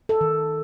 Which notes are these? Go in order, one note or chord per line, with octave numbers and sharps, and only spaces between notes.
A4
D#3